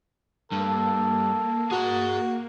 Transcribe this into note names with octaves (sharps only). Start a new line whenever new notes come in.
G2 A#3 A4
F#4 G#4 A#5